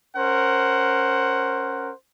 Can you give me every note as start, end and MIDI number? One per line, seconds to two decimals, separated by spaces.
0.16 1.91 61
0.16 1.91 70
0.16 1.91 72
0.16 1.91 78